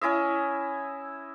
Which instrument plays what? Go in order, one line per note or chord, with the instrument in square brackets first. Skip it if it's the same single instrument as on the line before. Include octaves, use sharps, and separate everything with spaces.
[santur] C#4 E4 D#5 E5